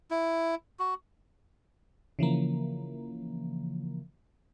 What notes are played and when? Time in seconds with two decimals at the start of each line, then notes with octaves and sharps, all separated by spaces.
0.11 E4
0.79 F#4
2.19 C#3 E3 F3 A#3